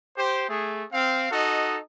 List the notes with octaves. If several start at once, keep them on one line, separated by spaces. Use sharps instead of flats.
G4 C5
A3 G#4
C4 F5
D#4 F#4 A4 D#5